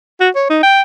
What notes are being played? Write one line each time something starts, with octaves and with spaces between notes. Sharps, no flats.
F#4
C#5
D#4
G5